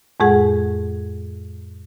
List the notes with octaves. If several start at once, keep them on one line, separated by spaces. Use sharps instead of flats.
F2 A2 G#3 G#4 F#5